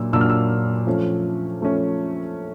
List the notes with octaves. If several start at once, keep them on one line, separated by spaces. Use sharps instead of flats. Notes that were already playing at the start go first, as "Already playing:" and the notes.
Already playing: A#2 F#3 A#3 D4 E6
A#2 F#3 A#3 D4 E6
F6
E6
F3 A3 C#4
F3 A3 C#4